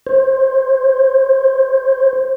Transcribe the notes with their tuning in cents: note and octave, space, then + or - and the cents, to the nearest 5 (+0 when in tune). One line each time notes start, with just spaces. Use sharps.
C5 +25